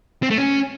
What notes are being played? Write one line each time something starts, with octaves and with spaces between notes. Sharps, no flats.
C4
A3
C#4